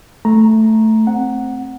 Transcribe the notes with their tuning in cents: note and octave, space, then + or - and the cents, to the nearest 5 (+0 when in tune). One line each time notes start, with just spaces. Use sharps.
A3 +0 A#5 +0
C4 +0 F#5 +0